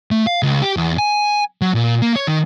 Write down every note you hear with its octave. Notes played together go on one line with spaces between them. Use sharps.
A3
F5
C#2
G4
E2
G#5
F#3
A#2
A#3
C#5
D#3